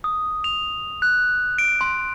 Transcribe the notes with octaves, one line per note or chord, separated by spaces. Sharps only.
D#6
F7
F#6
D7
C6